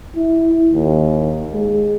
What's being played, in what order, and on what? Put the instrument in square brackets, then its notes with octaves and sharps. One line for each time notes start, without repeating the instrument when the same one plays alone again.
[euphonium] E4
D#2
G#3